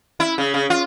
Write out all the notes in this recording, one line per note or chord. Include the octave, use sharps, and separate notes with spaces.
E4
C#3
C#3
F4